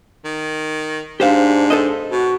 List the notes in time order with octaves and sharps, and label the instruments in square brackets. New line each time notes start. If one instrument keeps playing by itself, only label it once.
[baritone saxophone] D#3
[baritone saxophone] G#2 [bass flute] D4 [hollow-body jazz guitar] G4 C5 F5
[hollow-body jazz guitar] A4 C5 D#5
[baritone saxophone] B2 [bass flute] F#4